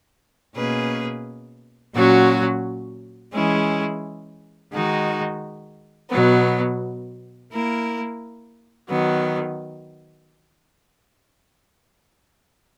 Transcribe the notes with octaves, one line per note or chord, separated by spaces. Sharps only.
B2 A#3 C#4 G#4 B4
A#2 F#3 C#4 F#4
E3 G#3 C#4 E4 G#4
D#3 G#3 D#4 F#4
B2 F#3 B3
A#3 E4 A#4
D#3 F#3 B3